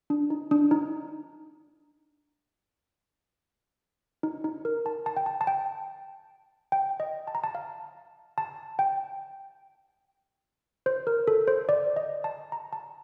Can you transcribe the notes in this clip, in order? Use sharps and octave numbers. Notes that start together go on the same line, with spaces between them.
D4
D#4
D4
D#4
D#4
D#4
A#4
A5
A5
G5
A5
A5
G5
G5
D#5
A5
A#5
A5
F5
A5
G5
C5
A#4
A4
C5
D5
D#5
A5
A#5
A5